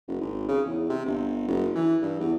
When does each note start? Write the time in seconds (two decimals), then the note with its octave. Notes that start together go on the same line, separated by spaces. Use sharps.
0.08 F#1
0.21 G#1
0.48 C#3
0.66 E2
0.89 C3
1.06 G1
1.48 F#1
1.75 E3
2.02 G2
2.20 E2